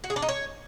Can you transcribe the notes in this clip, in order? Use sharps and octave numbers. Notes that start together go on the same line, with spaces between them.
F#4
G#4
D4
D#4
C#5